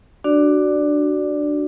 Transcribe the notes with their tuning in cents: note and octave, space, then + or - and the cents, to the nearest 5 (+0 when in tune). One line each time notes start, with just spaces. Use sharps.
D4 +10 F#4 +15 D5 +0